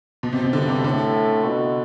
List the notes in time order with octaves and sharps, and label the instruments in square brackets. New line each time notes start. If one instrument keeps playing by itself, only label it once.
[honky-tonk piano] B2
C3
C3
[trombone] G2 [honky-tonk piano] D3
[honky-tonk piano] C3
[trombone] A2 [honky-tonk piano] D3
[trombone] B2